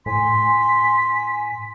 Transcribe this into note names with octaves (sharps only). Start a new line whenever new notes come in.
A2 G#5 C6 B6